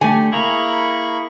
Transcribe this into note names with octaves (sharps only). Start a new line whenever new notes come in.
D3 A3 G4 G#5
A#3 E4 G#4 A#5 B5 C#6